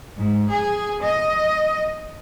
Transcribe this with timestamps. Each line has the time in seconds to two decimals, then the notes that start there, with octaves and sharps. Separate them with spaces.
0.17 G#2
0.50 G#4
1.02 D#5